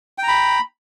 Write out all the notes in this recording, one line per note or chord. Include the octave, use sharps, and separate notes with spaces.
G5 A#5 B5